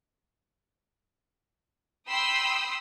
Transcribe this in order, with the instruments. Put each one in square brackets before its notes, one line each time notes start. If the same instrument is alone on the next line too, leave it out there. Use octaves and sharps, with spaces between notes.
[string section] G5 B5 C6 D#6 E6